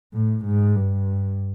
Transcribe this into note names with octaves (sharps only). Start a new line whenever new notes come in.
A2
G#2
G2